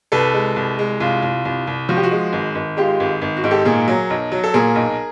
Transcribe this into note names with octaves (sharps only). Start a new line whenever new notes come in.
C2 A4 B4
G#3
C2
G#3
C2 F4
C2
C2
C2
F3 F#4
G4
F#4
G#3
G#1
G#1
G#3 F4 G4
G#1
G#1
F#4
G#2
G4 A4
A#2 G#4 A#4
F#3
B1
F#3
A4
A#2 G#4 A#4
B1